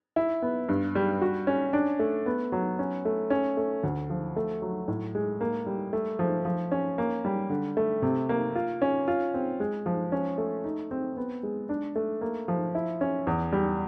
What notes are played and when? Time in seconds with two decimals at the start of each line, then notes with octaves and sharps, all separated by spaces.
0.16 E4
0.42 B3
0.69 G2
0.95 G3
1.22 F#4
1.47 C#4
1.73 D4
1.99 A3
2.26 B3
2.52 F#3
2.79 C#4
3.05 A3
3.30 C#4
3.57 A3
3.83 D2
4.10 F3
4.36 A3
4.62 F#3
4.88 A2
5.15 G#3
5.41 A#3
5.66 G3
5.93 A3
6.19 F3
6.45 F3
6.72 C#4
6.98 A#3
7.25 G3
7.50 D3
7.77 A3
8.02 C3
8.29 A#3
8.55 F4
8.82 C#4
9.08 F4
9.34 C4
9.60 G#3
9.86 F3
10.12 C#4
10.38 A3
10.64 D#4
10.91 C4
11.17 B3
11.43 G#3
11.69 D4
11.96 A3
12.21 A#3
12.48 F3
12.75 E4
13.01 C#4
13.27 E2
13.52 G3